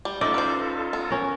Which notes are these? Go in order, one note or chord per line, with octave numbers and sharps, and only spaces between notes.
G3
A3 C#4 D#4 F4 A4 D5 D#5
B4 C5
B3
C#4 A#4